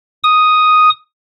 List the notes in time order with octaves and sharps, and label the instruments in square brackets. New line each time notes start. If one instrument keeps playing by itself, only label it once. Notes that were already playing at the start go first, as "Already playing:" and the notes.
[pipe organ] D#6